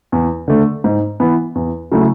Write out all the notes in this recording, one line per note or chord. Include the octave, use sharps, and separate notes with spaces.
E2
D3 A3
G#2
E3 B3
E2
C#3 F#3 A3 E4